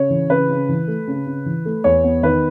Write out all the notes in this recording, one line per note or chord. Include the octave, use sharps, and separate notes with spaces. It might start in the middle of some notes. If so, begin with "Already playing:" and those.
Already playing: C#3 C#5
E3
C#3 B4
C#3
E3
A3
C#3
C#3
E3
A3
E2 C#5
B3
D#3 B4